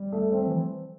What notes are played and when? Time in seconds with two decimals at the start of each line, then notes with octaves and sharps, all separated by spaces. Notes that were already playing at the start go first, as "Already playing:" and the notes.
Already playing: G3
0.12 A3
0.32 C4
0.47 E3